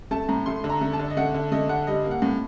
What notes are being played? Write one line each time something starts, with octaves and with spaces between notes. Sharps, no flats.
A3 A5
A2 A#5
A3 C6
D3
A#5
A3
A5
D3
D#5
A3 F#5
D3
A3 D#5
D3 F#5
G3 D#5
A#3
F#5
A2